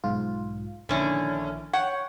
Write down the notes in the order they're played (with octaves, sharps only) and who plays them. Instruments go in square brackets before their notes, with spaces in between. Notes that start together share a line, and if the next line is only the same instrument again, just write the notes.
[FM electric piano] B1 G#2 F4
[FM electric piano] A#1 D#3 E4 [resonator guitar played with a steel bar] D3 C#4 D4
[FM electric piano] C#5 G5 [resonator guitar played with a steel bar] F#5